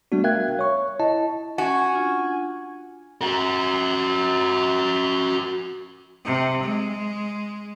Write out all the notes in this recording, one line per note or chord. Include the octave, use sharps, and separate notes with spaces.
G3 A3 B3 D4 F#4
A#4 E5 F5 G5 F#6 G#6
C#5 C#6
E4 D#5 A5
C#4 F#4 G#5
D4 F4
F#4 A#4
C3
G#3